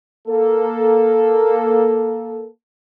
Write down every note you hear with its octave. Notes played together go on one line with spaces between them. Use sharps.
A#3 A4